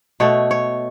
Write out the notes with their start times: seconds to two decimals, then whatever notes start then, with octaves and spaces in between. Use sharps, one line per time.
0.20 B2 A3 C#5
0.51 C#5